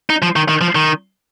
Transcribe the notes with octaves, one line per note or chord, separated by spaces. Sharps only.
D#4
F3
D#3
D#3
F3
D#3